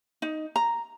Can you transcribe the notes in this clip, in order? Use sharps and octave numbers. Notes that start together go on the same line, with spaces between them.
D#4
A#5